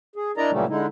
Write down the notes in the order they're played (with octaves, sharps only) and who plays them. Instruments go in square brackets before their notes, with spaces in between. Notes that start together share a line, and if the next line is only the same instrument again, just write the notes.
[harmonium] G#4
D4 E4 A#4 D5 D#5 A#5
A#2 C#3 E3 F#3 G3 A3
D3 G#3 D#4 E4